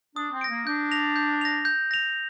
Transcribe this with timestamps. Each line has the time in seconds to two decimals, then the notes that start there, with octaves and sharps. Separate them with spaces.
0.16 D4 D#6
0.33 C4
0.41 A#6 D7
0.50 A#3
0.66 D4 G6
0.92 A#6 F7
1.16 G6
1.41 A#6 F7
1.65 G6
1.91 A#6 F7